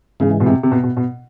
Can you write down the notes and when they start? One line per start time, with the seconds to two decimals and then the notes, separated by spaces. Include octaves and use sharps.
0.20 G#2 C#3 E3 G#3
0.40 B2
0.46 C3
0.63 C3
0.72 B2
0.84 B2
0.97 B2